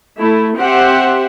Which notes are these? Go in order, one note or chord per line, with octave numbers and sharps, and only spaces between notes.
A3 E4
C4 G4 C5 E5 F#5